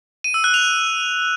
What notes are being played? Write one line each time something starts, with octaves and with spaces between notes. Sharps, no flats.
D#7
E6
F#6
F7